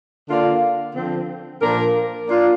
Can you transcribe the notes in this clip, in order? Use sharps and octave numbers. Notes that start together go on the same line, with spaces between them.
D3 A#3 F4 D5 F5
D3 F3 C4
A#2 F3 D4 A#4
A#3 D4 F4